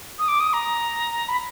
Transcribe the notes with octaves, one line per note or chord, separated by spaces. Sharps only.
D#6
D6
D#6
A#5
B5